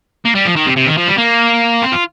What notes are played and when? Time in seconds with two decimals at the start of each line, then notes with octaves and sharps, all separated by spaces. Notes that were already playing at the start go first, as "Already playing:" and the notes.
0.25 A#3
0.35 G3
0.46 F3
0.56 D#3
0.67 C3
0.77 C3
0.87 D#3
0.98 F3
1.08 G3
1.18 A#3
1.82 C4
1.92 F4